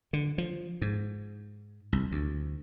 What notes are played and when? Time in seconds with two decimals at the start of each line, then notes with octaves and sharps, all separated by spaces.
0.13 D3
0.38 F3
0.82 G#2
1.92 C2
2.12 D2